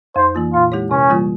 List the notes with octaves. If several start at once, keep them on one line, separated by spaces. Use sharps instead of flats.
F2 C5
E3 A#3 F4
A#2 F4
G#3 E4 G4 C#5
C3 C#4
E3 G3 A#3 F4